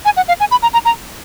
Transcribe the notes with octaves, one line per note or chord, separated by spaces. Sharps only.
G#5
F#5
F5
G#5
B5
A#5
A#5
A#5